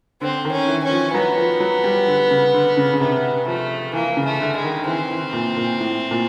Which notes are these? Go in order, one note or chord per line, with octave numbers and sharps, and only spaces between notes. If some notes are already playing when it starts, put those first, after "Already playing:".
D3 C4
D#3
C#4
E3
C#4
F3
F#3 B3
F3
F#3
G3
D3
C#3
D3
C#3
C#3
C3 B3
F3 A3
E3 A#3
C#3
A3
D3
G#3
D#3
E3 C4
E3
A#2
A#2
A2
A#2